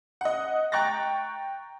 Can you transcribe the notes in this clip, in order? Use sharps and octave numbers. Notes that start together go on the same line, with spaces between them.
D#5 F#5
G5 A#5 C#6 F#6 A6 A#6